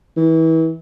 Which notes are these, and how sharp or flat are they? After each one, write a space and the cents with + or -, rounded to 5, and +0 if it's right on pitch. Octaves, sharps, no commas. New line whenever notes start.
E3 -30